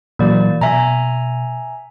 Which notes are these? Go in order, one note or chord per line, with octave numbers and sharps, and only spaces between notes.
A#2 E3 F#3 A#3 D5
B2 E5 G#5 A#5